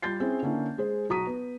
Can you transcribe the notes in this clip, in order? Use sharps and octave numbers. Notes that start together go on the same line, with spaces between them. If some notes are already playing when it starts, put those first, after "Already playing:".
G3 F4 G6 A6 C7
C4 C#4 E4 G#4 C5
D3 A#3 C#4 E4
G#3 G#4 C5
B1 F#4 A#5 D#6 B6 D#7
B3